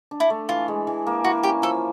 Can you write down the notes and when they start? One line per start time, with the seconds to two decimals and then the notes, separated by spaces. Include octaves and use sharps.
0.11 D4
0.20 E4
0.30 A3
0.49 E3 F4
0.68 G#3
0.87 E3
1.07 A#3
1.24 E3 F#4
1.43 C#4 G4
1.62 F3 A4